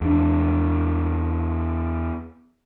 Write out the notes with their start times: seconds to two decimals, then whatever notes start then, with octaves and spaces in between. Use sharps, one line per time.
0.01 E2 D4